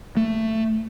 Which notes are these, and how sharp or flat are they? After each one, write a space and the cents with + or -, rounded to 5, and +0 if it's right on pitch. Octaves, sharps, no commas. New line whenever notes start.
A3 +10